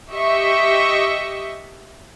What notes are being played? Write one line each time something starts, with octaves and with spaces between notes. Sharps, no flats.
G4 D#5 E5 C#6